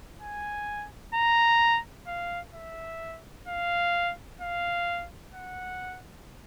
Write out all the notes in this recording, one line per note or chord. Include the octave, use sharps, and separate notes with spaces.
G#5
A#5
F5
E5
F5
F5
F#5